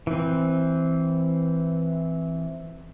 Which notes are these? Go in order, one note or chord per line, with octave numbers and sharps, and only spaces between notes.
E3 C4